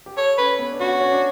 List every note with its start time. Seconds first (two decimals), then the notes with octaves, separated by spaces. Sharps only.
0.06 G4
0.17 A4 C#5
0.38 C#4 B4
0.59 B3
0.71 D4
0.80 C#4 F#4
1.00 C#4
1.12 D4